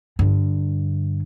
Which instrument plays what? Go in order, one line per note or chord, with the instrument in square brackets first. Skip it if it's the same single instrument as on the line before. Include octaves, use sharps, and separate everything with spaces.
[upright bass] G2 D3